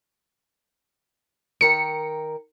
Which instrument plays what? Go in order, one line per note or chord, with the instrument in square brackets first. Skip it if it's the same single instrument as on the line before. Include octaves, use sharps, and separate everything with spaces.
[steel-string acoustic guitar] D#3 A#4 G5 [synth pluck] C#7